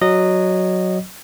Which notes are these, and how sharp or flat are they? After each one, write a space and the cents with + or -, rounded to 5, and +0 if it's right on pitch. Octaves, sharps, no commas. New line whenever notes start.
F#3 +0 D#5 -15